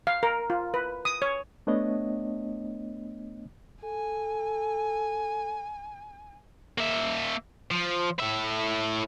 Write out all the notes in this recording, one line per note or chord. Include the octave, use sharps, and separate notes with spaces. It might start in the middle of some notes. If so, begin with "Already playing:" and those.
F5
A#4
F4
B4
D#6
C#5
A3 B3 D4 C#5 D#5
A4 G#5
A#3 E5
F3
A2 E5